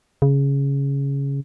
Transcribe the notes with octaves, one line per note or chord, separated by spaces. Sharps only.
C#3